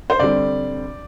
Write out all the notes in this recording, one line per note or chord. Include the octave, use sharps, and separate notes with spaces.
C5
D3 G3 C4 D5